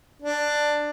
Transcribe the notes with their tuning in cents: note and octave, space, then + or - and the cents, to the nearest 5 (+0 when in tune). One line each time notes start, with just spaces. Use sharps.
D4 +10